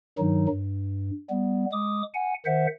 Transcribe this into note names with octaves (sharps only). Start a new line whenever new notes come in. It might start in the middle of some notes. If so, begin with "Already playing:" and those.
G2 D#3 F#3 D#4
G2
G3 B3
G#3 D6 D#6
F#5 G#5
D#3 C5 E5 F#5